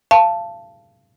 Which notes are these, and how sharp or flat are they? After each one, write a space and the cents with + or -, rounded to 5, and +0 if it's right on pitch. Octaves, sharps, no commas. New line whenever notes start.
F5 -30 A5 +0